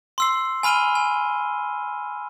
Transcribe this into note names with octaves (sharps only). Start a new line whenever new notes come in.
C6 E6 C7
G#5 B5 F6 D#7 G7
G#5